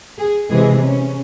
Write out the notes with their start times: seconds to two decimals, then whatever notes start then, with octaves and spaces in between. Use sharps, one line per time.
0.19 G#4
0.50 C3 E3 G#3 G#4
0.82 C#4